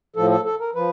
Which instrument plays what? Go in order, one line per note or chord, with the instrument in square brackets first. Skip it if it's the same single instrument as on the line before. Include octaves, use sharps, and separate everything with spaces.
[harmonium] A2 F3 A4
A4
A4
A#4
F3 B4